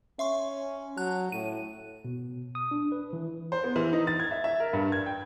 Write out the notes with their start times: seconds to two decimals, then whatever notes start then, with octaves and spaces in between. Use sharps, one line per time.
0.19 C#4 E5 C6 C#6
0.97 F#3 A5 F#6
1.32 A2 D#7
2.05 B2
2.55 D#6
2.71 D4
2.92 B4
3.13 E3
3.52 C5
3.64 B3
3.76 E3
3.93 D#4
4.07 A6
4.20 G#6
4.31 E5
4.44 E5
4.60 A#4
4.73 G2
4.92 G#6
5.06 G5